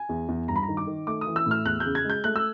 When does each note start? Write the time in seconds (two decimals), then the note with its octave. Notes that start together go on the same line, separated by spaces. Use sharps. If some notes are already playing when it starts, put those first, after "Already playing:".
Already playing: G#5
0.09 E2
0.28 E2
0.48 G2 A#5
0.56 B5
0.63 A#5
0.68 D#3
0.77 D6
0.87 D#3
1.07 A3 D6
1.21 D#6
1.27 E3
1.36 E6
1.46 A2 F6
1.65 E2 F#6
1.80 C#3 G6
1.95 G#6
2.04 G#3
2.10 G6
2.24 A3 F#6
2.36 E6